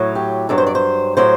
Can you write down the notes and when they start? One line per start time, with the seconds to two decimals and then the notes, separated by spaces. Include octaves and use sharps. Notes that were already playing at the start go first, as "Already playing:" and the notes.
Already playing: A2 F#3
0.15 G4
0.49 G2 F#3 A4
0.58 C5
0.67 D5
0.75 C5
1.17 A2 F#3 C5